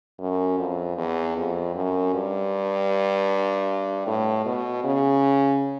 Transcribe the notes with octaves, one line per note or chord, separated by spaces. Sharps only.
F#2
F2
E2
F2
F#2
G2
A2
B2
C#3